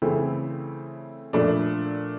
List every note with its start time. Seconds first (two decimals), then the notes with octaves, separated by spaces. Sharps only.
0.02 C#3 E3 A3 C4
1.33 A#2 F3 A3 D4